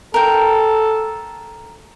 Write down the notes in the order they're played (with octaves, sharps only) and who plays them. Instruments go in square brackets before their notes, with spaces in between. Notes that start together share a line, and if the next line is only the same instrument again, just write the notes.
[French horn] A4 [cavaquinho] A#4 G5